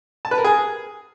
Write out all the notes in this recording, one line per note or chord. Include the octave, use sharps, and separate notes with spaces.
A5
B4
A#4
G#4